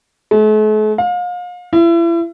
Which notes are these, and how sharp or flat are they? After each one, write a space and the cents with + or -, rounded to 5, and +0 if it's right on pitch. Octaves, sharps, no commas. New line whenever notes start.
A3 -45
F5 +35
E4 +35